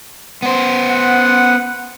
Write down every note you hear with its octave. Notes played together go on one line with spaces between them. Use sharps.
B3 C5
F#5